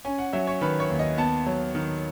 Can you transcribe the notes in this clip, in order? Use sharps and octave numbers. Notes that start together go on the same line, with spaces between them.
C#4 G#5
F#5
F#3 E5
C#5
D#3 B4
C#5
D#2
D#5
B3 A5
F#3
D#3